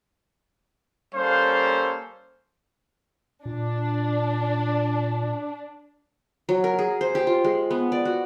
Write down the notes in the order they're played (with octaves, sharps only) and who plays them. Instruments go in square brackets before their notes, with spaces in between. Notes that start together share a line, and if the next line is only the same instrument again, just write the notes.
[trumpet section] G3 A#3 C#4 A4 C5 F5
[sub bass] A#2 [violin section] D4
[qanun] F#3
A#4
G#4
C5
G4
F4
G#3
B3
D5
F#4